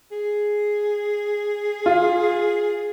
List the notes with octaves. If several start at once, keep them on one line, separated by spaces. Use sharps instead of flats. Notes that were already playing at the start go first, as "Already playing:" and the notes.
G#4
F4